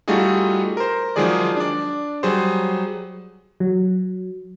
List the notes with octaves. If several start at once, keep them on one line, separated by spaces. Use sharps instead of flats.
G3 A3 D#4 F4 F#4 G#4
A#4 C5
D#3 F3 F#3 G#3 G#4 D5
D4 D5
F#3 G3 G#4 C5
F#3